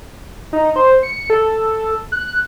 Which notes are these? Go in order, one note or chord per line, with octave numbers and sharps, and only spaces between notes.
D#4
C5
C#7
A4
F#6